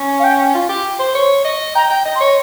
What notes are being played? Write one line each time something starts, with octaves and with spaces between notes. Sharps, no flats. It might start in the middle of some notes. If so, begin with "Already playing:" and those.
Already playing: C#4
F5
G5
F4
G4
C5
C#5
D#5
G5 A#5
G5
D#5
C6
C#5